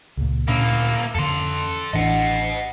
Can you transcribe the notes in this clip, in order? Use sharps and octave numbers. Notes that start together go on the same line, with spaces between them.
C#2 A#2
D2 A#2 A#3 C#4 E4
F2 D3 A4 C6
A1 E3 D4 D#5 F#5